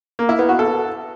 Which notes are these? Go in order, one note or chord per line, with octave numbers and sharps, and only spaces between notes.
A#3
E4
B3
F#4
A4